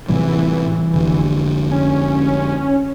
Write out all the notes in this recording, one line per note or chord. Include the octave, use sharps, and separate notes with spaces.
A2 C3 E3 G3
F1 D3
C#4